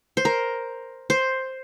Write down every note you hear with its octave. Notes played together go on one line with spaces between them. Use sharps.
C5
A#4
C5